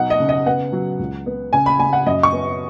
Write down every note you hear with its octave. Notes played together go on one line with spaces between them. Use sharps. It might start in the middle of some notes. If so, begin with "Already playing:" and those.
Already playing: B2 F#3 D#4 F#5
D#5
C#3
D#5
B3 F#5
F#3
C#2
B3
C#3 G#5
B5
C#3 G#5
F#5
F#2 D#5
C#6
B3